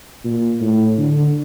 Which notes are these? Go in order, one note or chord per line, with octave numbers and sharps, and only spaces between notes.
A#2
A2
D3